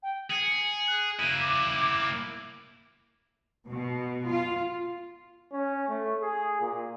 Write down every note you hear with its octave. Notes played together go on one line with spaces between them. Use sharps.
G5
G#4 C#7
F#6
A#3 E4 D#7
D6
B2
F4
C#4
A3
G#4
A#2